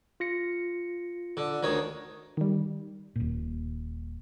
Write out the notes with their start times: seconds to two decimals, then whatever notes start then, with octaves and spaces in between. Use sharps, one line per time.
0.20 F4 A#6 C#7
1.37 D3
1.63 D2 D#3 C#5
2.37 D#3 G3
3.16 D#1 A#2